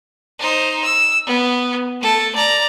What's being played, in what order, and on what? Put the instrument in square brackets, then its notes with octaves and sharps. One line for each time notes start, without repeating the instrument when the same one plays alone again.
[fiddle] D#4 C5
E6
B3
A3 A4
D5 A#5